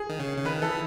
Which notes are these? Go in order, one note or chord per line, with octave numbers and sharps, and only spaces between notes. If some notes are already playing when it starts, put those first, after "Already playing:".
Already playing: G#4
D#3
C#3
C#3
D#3 B4
E3 A4